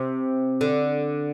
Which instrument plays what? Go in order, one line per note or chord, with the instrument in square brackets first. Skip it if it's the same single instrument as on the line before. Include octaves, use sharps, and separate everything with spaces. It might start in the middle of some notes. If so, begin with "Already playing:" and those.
Already playing: [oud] C3
D3